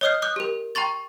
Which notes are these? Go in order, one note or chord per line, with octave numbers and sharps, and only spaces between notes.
C#5 D#5 D#6 F6 G6 C7
D6 D#6 F#6 G6
G4 A#4
G5 A#5 C6 C#6 A6